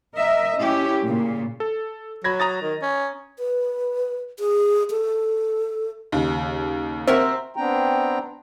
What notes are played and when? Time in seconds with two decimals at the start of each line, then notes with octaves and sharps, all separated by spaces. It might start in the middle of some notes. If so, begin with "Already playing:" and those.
0.15 A#4 D#5 E5
0.57 C#4 E4 G4
1.05 A#2 C#3
1.60 A4
2.24 F#3 B5 G#6 A#6
2.40 A#5 D#6 A6
2.62 D#3
2.82 C#4
3.39 B4
4.39 G#4
4.91 A4
6.12 D#2 C#3
7.08 C4 F#4 A#4 E5
7.56 B3 C4 D4 G5 A#5